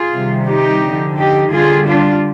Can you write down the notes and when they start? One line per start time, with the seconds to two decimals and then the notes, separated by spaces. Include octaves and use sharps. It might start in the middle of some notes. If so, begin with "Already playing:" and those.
Already playing: F4 G#4
0.11 C3 D#3 G3
0.47 D#4 G4
0.83 D3 F3
1.18 D#4 G4
1.53 D3 G3 F4 G#4
1.88 D4 F4